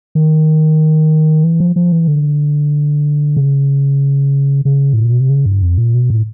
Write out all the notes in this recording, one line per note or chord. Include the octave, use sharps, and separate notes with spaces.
D#3
E3
F3
F3
E3
D3
C#3
C#3
A2
A#2
B2
C3
C#3
G2
F2
A#2
B2
A2